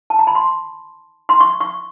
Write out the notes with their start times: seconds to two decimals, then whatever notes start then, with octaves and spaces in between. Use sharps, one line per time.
0.10 A5
0.19 A#5
0.27 B5
0.35 C6
1.29 C6
1.40 C#6
1.60 C#6